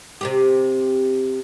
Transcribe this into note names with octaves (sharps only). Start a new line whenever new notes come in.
C3 C4 G4